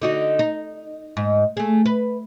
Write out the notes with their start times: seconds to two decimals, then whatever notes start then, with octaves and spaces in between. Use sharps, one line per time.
0.02 D3 D#4 F#4
0.39 D#4
1.17 G#2
1.57 A3 G#4
1.86 B4